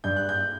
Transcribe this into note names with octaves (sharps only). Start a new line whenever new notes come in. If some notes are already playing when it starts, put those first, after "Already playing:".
G2 G6
F#6
G6